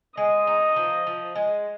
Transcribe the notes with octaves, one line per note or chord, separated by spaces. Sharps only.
G#3 D#5
D#4
F3
F3
G#3